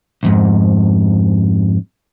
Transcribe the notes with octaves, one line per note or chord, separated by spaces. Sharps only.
C2 F2 G#2